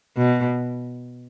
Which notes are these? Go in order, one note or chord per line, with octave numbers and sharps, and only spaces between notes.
B2